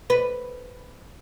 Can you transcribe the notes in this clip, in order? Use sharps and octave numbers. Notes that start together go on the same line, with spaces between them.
B4